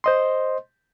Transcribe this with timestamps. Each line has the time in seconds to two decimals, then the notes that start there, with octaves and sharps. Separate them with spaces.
0.04 C5 D#5 C6